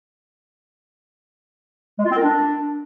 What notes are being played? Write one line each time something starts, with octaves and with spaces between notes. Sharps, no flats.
G#3
F4
C4
A#4
D4